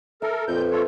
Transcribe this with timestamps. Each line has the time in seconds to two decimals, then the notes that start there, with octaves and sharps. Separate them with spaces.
0.22 A4 A#4 E5
0.48 F2 A#2 B4 G6
0.71 F4 A4 C#5